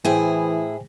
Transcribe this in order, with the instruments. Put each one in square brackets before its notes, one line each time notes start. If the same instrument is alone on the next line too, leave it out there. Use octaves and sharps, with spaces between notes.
[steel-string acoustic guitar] A2 E4 G#4 [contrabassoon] E3 [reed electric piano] C5 G5 G#5